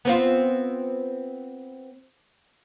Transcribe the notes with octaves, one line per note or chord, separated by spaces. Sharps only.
B3 C4 F4